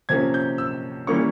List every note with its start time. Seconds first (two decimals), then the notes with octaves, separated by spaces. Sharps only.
0.09 C3 F3 A#3 C#4 G#6
0.34 G6
0.58 E6
1.07 E3 G3 A#3 C#4 C#6